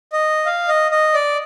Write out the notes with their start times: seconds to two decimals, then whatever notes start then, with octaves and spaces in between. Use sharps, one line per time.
0.13 D#5
0.46 F5
0.68 D#5
0.91 D#5
1.14 D5